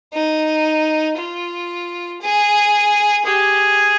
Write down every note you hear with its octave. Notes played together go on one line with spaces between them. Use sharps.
D#4
F4
G#4
G4 G#4